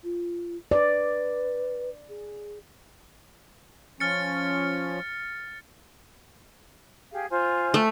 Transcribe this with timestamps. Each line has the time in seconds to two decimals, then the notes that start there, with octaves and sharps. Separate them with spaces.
0.03 F4
0.71 B4 D5
2.09 G#4
4.00 F3 C#4 F6 A6 C#7
7.12 G4 G#4 F5
7.30 F4 C5 G#5
7.74 A3